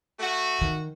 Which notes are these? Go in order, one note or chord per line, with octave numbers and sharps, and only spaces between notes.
A3 F#4
D#3